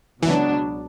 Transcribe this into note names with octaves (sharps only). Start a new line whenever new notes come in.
C#2 B2 E3 F#3 B3 D4